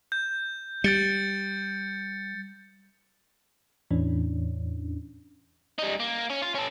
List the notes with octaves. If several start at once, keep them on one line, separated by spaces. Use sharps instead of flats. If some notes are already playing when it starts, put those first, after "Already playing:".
G6
G3 G6 A6 C#7
E2 A2 E3 C#4 D4
G3 D#4
A#3
C#4
F4
C#4 A4